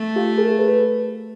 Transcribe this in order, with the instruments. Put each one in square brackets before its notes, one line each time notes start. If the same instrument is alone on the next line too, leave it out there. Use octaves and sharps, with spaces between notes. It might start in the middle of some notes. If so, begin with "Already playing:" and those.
Already playing: [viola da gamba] A3
[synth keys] F4 G4
G#4 A#4
A4 B4